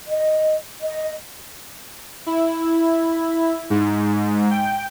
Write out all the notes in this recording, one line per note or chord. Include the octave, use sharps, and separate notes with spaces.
D#5
D#5
E4
G#2
G5